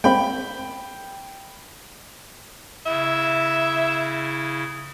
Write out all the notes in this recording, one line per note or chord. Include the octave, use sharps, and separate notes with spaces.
G#3 A#3 C4 G5 B5
C#3 E4 E5